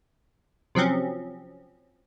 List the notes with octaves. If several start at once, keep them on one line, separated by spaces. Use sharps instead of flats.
C3 F3 F#3 C4 C#4